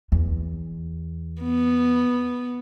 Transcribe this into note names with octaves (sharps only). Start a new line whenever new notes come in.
E2
B3